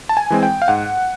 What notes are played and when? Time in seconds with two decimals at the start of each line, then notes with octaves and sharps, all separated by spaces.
0.09 A5
0.17 G#5
0.30 E3 G#3 C4
0.43 G5
0.62 F5
0.68 G#2 F#5